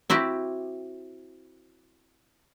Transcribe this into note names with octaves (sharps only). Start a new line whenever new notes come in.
C4 E4 F#4 G4